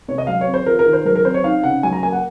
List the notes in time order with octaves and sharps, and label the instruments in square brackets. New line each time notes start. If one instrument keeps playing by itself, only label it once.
[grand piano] C3 C#5
D#5
F#3 F5
C#5
C4
C5
F4 A#4
A#4
D#3
C5
F#3 A#4
A#4
C4 C5
C#5
D#4 F5
C#3 F#5
F#3 G#5
A#5
A#3 G#5
F#5